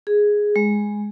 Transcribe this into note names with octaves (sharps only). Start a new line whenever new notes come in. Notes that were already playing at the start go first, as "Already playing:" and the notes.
G#4
G#3